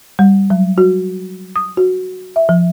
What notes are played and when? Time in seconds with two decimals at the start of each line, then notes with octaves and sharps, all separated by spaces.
0.19 G3
0.50 F#3
0.78 F#4
1.56 D#6
1.77 F#4
2.36 E5
2.49 F3